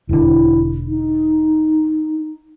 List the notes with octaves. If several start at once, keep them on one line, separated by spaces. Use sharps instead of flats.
E1 D3 E4
D#4